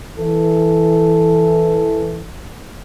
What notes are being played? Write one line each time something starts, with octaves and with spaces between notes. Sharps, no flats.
E3 A4